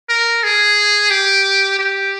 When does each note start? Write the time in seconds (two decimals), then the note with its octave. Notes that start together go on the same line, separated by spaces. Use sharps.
0.09 A#4
0.43 G#4
1.11 G4
1.79 G4